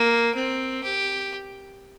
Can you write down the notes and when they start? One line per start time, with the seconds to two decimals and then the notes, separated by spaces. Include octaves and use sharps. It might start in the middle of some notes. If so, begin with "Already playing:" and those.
Already playing: A#3
0.35 C4
0.84 G4